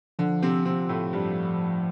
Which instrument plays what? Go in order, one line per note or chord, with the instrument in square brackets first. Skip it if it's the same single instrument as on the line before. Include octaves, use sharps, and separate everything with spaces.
[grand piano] D3 [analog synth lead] F3
[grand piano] C3 C4
C3 C4
A2 A3
G2 G3